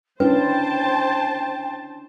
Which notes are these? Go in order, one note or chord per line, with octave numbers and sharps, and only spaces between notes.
C#4 D4 E4 B4 C5 G5 A5